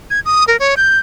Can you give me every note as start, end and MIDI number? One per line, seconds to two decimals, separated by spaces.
0.10 0.20 92
0.25 0.45 87
0.48 0.57 70
0.60 0.75 73
0.77 0.99 91